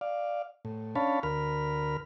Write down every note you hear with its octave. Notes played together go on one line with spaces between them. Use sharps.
D5 F5
A2
C#4 D4 C#5 F5 A5 B5
D2 A#4 B5 F6